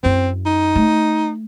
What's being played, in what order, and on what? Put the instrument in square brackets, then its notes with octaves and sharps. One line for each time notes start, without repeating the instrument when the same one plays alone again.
[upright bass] F#2 E4 [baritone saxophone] C4
[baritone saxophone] D#4
[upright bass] A3